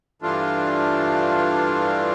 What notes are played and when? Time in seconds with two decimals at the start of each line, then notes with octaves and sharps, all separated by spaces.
0.22 G2 E3 A3 D4 F4